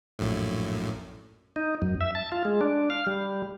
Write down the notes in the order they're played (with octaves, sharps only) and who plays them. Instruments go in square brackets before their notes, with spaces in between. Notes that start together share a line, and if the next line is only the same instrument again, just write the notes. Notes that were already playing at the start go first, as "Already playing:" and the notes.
[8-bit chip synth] A#1 F#2 A2
[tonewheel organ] D#4
F#2
E5
A5
F4
G#3
D4
F5
G3